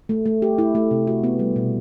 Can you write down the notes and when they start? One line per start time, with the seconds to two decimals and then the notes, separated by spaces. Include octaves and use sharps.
0.09 A3
0.26 A3
0.42 G4
0.58 E4
0.75 A3
0.91 C3
1.07 F#4
1.24 B3
1.39 G3
1.56 B2